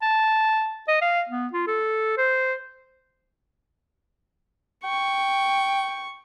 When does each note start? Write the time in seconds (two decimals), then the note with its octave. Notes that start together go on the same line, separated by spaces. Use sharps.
0.02 A5
0.88 D#5
1.01 F5
1.29 B3
1.53 F4
1.67 A4
2.18 C5
4.84 G5 C#6